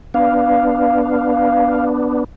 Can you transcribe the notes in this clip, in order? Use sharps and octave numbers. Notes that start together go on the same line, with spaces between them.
B3 D4 F5